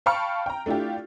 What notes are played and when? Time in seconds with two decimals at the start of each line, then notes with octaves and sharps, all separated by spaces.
0.06 F5 G5 A5 B5 C#6 F6
0.46 G5 A#5
0.66 A3 D4 E4 F4 G4